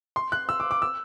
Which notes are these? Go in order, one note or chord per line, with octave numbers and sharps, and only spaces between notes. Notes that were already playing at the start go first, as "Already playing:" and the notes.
C6
F#6
E6
D6
D6
E6